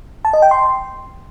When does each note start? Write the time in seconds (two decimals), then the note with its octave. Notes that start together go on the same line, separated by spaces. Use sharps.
0.25 A5
0.33 D#5
0.42 G5
0.51 C6